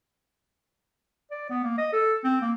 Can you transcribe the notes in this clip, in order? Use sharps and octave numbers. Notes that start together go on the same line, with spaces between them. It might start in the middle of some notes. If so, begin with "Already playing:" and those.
D5
B3
A#3
D#5
A4
C4
A#3